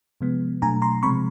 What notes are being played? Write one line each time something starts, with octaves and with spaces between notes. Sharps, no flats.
C3 F3 G#3 B3
B2 F#3 A3 D4 G#5 A#5
A#5 C6
C3 F3 G#3 C4 B5 C#6